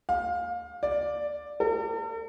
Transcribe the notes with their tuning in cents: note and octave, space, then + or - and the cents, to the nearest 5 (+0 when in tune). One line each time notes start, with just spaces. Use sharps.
F5 +25
D5 +5
A4 +45